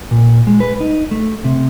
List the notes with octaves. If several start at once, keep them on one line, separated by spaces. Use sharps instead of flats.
A#2
G#3
B4
D#4
A3
C3